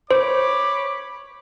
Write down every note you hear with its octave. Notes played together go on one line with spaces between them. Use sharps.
C5 C#5 B5 D6